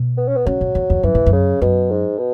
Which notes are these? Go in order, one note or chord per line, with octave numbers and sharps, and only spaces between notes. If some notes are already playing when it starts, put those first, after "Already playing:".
Already playing: B2
B3
C#4
B3
C#3 F#3
G#2
E2
E2
F#2 E3
G#2
F#2
C#3
F#2 B2
G#2
B2